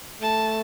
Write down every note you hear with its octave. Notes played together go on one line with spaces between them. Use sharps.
A3 A5